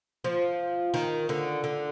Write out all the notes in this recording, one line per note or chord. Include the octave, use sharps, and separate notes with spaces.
F3
D#3
D3
D3